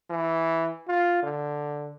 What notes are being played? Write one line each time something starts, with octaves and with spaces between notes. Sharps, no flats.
E3
F4
D3